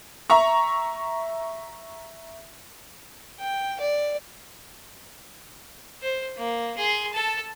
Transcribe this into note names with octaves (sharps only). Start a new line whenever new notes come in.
E5 A#5 C#6
G5
D5
C5
A#3
G#4 C6
A4 A5